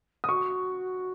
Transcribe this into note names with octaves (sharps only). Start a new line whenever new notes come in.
D#6
F#4 C#6